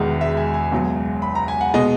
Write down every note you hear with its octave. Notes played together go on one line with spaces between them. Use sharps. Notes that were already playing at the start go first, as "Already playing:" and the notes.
Already playing: E1 E2 D#3 G#3
E5
G#5
G#5
C#2 B2 F#3
B5
A#5
G#5
F#5
B2 G#3 D#5